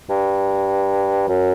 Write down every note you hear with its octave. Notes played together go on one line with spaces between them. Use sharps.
G2
F#2